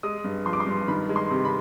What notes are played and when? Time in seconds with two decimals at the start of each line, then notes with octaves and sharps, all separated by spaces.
0.03 G#3 D#6
0.24 G2
0.46 F3 C6
0.53 D6
0.60 C6
0.67 G2
0.88 D#3 B5
1.09 G#3
1.16 C6
1.30 C3
1.45 B5